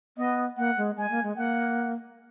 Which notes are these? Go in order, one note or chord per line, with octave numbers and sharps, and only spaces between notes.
B3 D#5
A#3 F#5
G#3
G#3 G#5
A#3
G#3
A#3 F#5